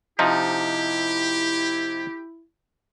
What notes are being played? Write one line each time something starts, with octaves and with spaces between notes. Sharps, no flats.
C3 F3 D#4 E4 G4